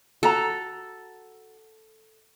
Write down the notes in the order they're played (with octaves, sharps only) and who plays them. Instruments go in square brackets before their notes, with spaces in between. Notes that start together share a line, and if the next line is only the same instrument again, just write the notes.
[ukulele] F#4 A#5 [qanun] A4